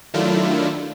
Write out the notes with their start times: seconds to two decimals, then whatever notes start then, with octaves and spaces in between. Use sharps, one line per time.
0.14 D#3 F#3 A3 D4 E4 F4